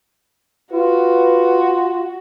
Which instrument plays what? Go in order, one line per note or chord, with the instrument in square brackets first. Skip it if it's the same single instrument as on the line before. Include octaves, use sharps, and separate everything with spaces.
[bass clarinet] F4 [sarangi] F#4 [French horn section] B4